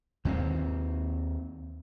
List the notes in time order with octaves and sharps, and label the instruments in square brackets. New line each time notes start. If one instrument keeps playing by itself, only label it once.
[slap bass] D#2 D#3 A#3 C4